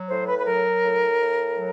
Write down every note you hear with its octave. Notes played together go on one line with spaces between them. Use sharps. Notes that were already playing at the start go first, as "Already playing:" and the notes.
Already playing: F#3
A2 C5
B4
B4
F#3 A#4
A2
A2
F#3